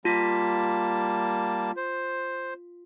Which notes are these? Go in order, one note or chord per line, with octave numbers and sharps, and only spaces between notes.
G3 A#3 F4 A5 B6
C5